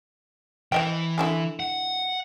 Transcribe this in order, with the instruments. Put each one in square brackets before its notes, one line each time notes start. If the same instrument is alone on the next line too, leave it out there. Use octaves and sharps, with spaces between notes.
[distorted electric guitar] E3 [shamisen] C5 D#5 G5
[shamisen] D3 E4 G#4
[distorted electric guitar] F#5